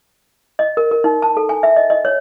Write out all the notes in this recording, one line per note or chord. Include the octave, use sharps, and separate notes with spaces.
D#5
A#4
A#4
D#4
A5
A4
G#5
E5
D#5
D#5
C#5